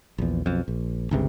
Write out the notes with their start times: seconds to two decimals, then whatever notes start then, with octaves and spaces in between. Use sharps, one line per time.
0.18 A#1 E2
0.46 B1 F2
0.68 A#1
1.11 G1 C#2 C3